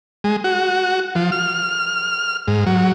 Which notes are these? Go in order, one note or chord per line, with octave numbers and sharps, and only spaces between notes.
G#3
F#4
F3
F6
G#2
F#3